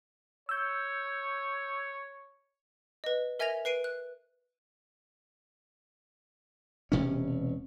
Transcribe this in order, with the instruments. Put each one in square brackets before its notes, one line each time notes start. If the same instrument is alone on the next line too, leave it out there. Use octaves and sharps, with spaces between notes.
[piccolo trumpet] C#5 [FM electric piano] E6 G6
[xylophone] B4 D#5
A#4 E5 G#5 G#6 A#6 F7
B4 C7 D7 D#7
F#6
[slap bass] E1 C3 C#4